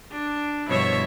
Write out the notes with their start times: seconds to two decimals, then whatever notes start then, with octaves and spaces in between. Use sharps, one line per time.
0.12 D4
0.68 G2 B2 F3 E4 C#5 E5